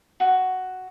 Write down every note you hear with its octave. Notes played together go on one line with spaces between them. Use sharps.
F#4